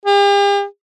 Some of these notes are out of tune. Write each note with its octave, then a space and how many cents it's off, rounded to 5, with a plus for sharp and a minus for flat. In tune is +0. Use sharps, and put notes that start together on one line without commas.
G4 +45